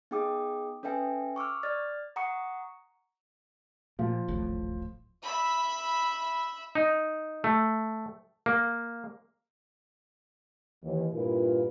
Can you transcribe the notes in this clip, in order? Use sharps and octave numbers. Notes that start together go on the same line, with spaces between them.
B3 D#4 G#4 G5 D6 D#6
C#4 A4 B4 E5 G5 G#5
C#6 D6 E6 F6
D5 F6 A6
F#5 A#5 C#6 D#6 C#7
A#2 F3
D1 G#1 A2
E5 B5
D#4
A3
A#3
D#2 E3
G2 A#2 E4 F4 A#4 B4